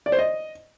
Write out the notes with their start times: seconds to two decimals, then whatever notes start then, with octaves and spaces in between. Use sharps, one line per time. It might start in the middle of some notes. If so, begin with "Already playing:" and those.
0.06 D5
0.12 C5
0.19 D#5